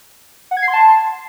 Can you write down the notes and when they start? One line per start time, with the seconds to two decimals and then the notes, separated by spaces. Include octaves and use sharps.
0.51 F#5
0.57 G#6
0.62 C7
0.68 C6
0.73 A5